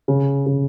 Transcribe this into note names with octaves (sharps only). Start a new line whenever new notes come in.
C#3
C#3